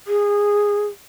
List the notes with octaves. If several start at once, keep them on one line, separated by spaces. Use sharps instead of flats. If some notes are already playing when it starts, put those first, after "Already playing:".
G#4